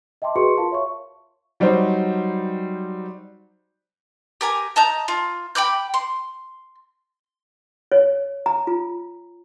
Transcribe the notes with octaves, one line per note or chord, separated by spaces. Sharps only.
D#5 E5 G5 A5 C6 D6
F#4 G#4 B4 C6 C#6 C#7
F4 A#4 F5 A5 C6
C#5 E5 F5 C#6
F#3 G3 D#4 F#4 C5
G4 A#4 G#5
D#5 A5 A#5 G6
F4
G5 B5 D6 G6
C6
C#5
A#5
F4